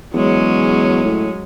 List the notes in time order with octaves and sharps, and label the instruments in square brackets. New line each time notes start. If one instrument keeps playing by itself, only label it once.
[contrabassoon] E2 [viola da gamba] F#3 G#3 C#4
[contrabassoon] A2